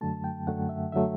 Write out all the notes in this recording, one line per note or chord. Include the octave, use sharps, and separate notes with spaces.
F#2 D3 F#3 A3 A5
G5
F#2 D3 F#3 A3 F#5
E5
D3 F#3 A3 E5